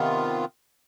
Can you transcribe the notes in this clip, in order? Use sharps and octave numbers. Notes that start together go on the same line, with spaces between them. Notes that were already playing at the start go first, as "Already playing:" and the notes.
Already playing: C3 D#3 B3 F4